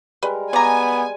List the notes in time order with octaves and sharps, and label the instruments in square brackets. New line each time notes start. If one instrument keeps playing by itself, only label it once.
[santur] G3 G#3 A#4 [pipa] B4
[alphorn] B3 [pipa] D5 A#5 [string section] G#5